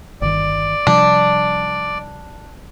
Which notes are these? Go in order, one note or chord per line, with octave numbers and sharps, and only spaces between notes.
G1 D#3 D5
C3 F3 G3 D4